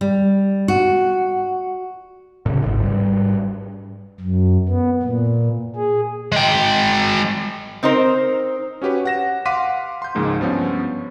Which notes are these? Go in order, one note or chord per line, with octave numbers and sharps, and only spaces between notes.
G3
F#4
A2 C#3
D1 G#1 G#2
G#2 G3
F#2
B3
A#2
G#4
G#3 G5
C4 D#4 A#4 C5
C#4 F#4 G4 B4 C#5
F#5 A#6 E7
F5 F#5 C6 D6 B6 D#7
C6 G6
C#2 G#2 F3 G#3 A#3
G2 F3 B3 C#4